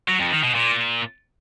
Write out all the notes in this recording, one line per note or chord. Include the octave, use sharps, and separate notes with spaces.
F#3
F2
D#3
B2
A#2